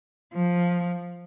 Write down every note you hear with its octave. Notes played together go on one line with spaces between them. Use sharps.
F3